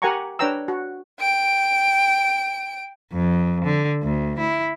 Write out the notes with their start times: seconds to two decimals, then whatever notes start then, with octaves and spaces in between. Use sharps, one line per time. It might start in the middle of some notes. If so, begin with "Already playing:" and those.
0.02 G4 A#4 F#5 G#5 A#5 C#6
0.39 D4 B4 C#5 G5 A#5 E6
0.68 F#4
1.20 G5 D7
3.12 F2
3.65 D3
4.03 D2
4.39 E4